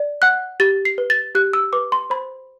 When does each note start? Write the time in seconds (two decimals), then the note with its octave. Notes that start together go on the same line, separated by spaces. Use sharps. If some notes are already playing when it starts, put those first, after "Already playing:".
Already playing: D5
0.22 F#5 F#6
0.60 G4 A6
0.85 C7
0.98 B4
1.10 A6
1.35 G4 F#6
1.53 E6
1.73 B4 D6
1.92 C6
2.10 C5 B5